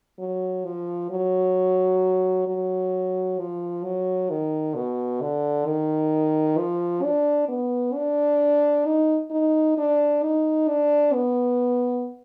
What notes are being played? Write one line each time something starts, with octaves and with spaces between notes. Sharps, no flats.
F#3
F3
F#3
F#3
F3
F#3
D#3
B2
D3
D#3
F3
D4
B3
D4
D#4
D#4
D4
D#4
D4
B3